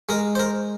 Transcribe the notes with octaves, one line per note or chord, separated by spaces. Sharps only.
G#3 A#4
C5
A#4